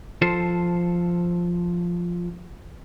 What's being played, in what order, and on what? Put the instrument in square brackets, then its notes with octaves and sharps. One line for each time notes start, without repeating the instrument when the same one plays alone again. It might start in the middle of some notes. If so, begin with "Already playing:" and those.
[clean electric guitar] F3 F4 A4 C5